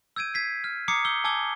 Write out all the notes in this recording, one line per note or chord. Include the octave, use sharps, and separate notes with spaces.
E6 G6 G#6 D7 D#7
G#6 B6 C7
F6
A#5 D6 D#6 G#6 C7 C#7
E6 G6 G7
G#5 A5 D6 E6 G#6 G7